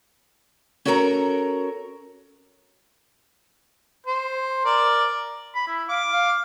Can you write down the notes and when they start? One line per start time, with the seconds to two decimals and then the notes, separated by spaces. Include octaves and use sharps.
0.85 C#4 F#4 A4 A#4 G5 A#5
4.06 C5
4.65 A#4 D5
5.55 B5
5.68 E4
5.89 F5 D6
6.12 F5